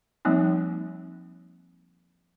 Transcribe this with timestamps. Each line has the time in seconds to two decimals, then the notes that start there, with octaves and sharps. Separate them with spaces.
0.25 F3 G3 A#3 C4 D#4